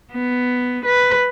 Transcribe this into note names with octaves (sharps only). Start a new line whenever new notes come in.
B3
B4